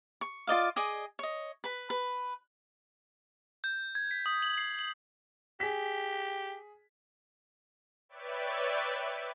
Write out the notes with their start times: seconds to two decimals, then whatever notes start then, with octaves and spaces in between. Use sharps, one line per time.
0.21 C#6
0.47 F4 D5 D#5 F5
0.76 G#4 D5 D#5 G#5
1.19 C#5 D#5
1.64 B4 B5
1.90 B4
3.64 G6
3.95 G#6
4.11 B6
4.26 D#6
4.42 F#7
4.58 C7
4.79 F#7
5.60 G4 G#4 B6
8.09 B4 C#5 D5 E5 G5 A6